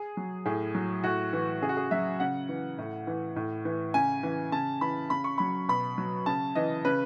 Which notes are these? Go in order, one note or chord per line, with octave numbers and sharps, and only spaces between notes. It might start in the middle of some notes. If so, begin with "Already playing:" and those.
Already playing: G#4
F#3
A2 G#4
F#3
A2 F#4
E3
C#3 G#4
F#4
G#4
F#3 E5
C#3 F#5
E3
A2
E3
A2
E3
C#3 G#5
E3
C#3 A5
E3 B5
C#3 B5
C#6
F#3 B5
B2 B5
F#3
C#3 A5
E3 D#5
C#3 B4